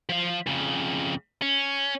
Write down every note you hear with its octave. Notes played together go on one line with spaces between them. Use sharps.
F3 F5
F2 C#3
C#4